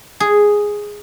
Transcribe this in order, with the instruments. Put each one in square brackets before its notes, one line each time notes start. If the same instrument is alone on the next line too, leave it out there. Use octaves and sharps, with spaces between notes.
[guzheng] G#4